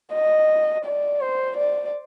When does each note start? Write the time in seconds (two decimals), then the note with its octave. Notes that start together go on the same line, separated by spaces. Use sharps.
0.13 D#5
0.85 D5
1.20 C5
1.56 D5